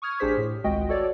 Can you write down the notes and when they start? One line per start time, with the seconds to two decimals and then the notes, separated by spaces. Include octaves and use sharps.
0.02 C#6 D#6 F6 G#6
0.20 A1 D4 G4 G#4 C5 B6
0.37 A2
0.64 G#1 C#2 G#3 F#4 D#5 G5
0.89 F#4 A4 C#5 D5